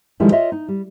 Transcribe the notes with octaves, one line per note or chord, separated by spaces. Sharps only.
D3 D#3 F3 G3 G#3 E4
F4 C#5 D#5 E5
D#4
G3